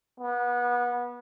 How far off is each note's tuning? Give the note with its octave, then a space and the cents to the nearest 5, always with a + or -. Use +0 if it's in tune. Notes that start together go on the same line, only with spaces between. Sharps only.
B3 -25